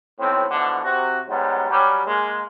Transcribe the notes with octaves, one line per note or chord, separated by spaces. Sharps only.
B1 A2 C4
B2 D3 E3 F3
C3 F#4
G#2 F#3 G3 B3
F#3 G3 C#4 G4
G#3 A#3